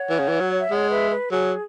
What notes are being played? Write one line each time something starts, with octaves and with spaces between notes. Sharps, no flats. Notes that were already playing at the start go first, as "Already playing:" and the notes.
Already playing: C#5 F#5
E3
C#3
E3
F#3
E5
G#3 C#5 F#5
B4 E5
B4
F#3 G#4